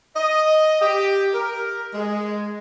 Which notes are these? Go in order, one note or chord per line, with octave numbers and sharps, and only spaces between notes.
D#5
G4
A#4
G#3